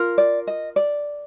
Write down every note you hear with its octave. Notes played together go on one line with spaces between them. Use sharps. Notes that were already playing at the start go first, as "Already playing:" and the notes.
Already playing: F4 A#4
D5
D#5
D5